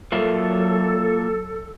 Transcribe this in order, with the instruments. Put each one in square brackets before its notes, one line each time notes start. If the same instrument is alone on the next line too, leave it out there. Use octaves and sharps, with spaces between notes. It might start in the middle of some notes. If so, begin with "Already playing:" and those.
[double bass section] F#3 [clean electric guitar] A#3 F4 E5 [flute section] A4